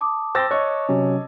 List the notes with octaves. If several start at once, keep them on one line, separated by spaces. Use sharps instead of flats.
A5 D6 D#6
C5 G5 C6 E6 A6 A#6
C#5 D#5 C#6 F#6
C3 F#3 C#4